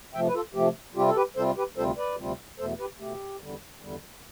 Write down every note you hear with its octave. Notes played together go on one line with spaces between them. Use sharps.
C3 F3 A3 E5 G5
B4
F4 A4
C3 F3 A3 G4
C3 G3 C4 F4 G4
A4
G4 B4
C3 G3 C4 F4 A4 C5
G4 B4
D2 C3 G3 C4 F4 A4 C5
B4 D5
D2 C3 G3 C4 F4
E2 B2 A3 A4 C5
G4 B4
E2 B2 A3 G4
E2 D3 G3
E2 D3 G3